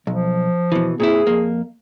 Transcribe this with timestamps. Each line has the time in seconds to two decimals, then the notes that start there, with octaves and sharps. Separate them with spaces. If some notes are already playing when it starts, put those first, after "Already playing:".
0.07 B1 F3
0.72 B2 E3
1.00 A#2 C4 E4 G#4
1.27 F2 A#3